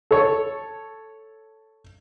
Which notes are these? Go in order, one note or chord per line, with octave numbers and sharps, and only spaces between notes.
A4 C#5